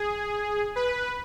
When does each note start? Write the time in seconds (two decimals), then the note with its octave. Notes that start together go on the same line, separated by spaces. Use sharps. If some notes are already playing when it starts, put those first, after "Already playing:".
Already playing: G#4
0.76 B4